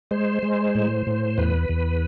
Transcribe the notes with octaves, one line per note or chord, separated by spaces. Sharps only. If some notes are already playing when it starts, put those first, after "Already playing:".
G#3 C5
G#3
A2
A2
E2 B4
E2